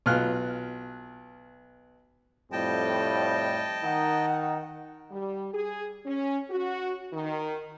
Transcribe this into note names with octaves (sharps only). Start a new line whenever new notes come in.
B1 F4 F6 F#6
F2 A2 G3 D#5 G5 A5
D#3 D#4 F#5
G3
G#4
C#4
F#4
D#3